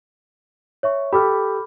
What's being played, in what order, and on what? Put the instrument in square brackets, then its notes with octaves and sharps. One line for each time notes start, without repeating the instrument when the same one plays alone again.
[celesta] C#5 E5 C#6
[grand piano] G4 A4 [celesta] B5 D6 F6